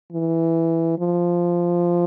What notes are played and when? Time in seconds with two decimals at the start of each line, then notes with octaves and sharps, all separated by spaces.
0.12 E3
0.98 F3